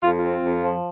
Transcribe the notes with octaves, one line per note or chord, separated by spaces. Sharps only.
F2 F4
F4
C4
F2
F3